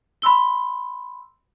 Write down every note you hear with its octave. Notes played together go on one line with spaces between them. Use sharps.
B5 C6 E6 G7